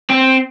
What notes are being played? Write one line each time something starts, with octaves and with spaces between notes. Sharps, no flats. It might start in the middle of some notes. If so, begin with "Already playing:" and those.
C4